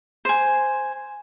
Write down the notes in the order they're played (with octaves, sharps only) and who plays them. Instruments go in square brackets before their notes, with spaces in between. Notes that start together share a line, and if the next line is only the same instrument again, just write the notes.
[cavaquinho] C5 G#5